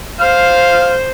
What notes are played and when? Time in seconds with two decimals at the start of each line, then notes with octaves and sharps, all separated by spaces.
0.20 C5 F5